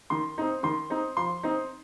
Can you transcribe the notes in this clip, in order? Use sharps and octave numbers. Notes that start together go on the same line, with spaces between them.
D#3 C6
C4 D#4
D#3 C6
C4 D#4
F3 C6
C4 D#4